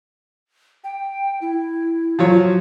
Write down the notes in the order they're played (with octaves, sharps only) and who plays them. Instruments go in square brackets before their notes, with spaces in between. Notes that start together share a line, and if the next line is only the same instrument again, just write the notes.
[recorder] G5
E4
[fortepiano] F3 F#3 C#5